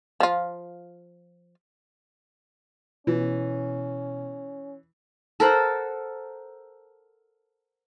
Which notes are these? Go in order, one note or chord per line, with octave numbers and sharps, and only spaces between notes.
F3 F4
B2 E3 C#4
A4 A#4 C5 F#5